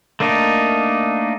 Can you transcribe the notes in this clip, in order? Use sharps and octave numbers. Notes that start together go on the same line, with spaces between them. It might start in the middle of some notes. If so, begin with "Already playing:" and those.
A3 A#3 D4 D#4